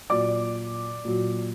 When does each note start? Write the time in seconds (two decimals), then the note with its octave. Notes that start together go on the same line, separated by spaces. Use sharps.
0.10 A#2 F#3 D5 D6
1.05 A#2 F#3